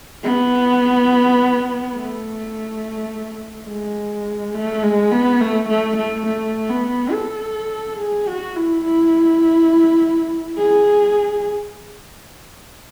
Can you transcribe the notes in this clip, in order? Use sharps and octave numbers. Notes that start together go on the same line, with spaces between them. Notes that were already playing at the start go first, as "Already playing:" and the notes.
B3
A3
G#3
A3
G#3
B3
A3
A3
A3
A3
B3
A4
G#4
F#4
E4
E4
G#4